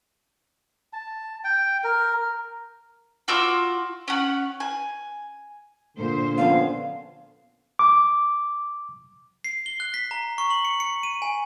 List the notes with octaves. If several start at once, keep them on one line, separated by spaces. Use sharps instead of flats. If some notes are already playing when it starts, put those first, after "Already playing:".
A5
G5
A#4
F4 F#4 D6 E6
C#4 F#5
G#5
A#2 D3 C5
F3 B3 C#4 F5
D6
C7
G7
F#6
B6
A#5
C#6
F#7
C#7
C#7
D#7
G#5